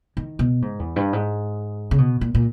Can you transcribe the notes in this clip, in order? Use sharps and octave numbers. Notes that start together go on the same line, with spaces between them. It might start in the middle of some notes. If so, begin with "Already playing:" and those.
D#3
B2
G#2
E2
G2
G#2
C#3
B2
A#2
A#2